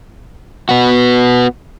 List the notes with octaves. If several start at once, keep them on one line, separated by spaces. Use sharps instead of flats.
B3 F#4